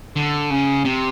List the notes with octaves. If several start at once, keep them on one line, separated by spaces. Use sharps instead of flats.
D3
C#3
C3